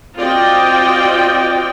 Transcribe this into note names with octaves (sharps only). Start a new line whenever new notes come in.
C4 F4 F#4 D5 D#5 G5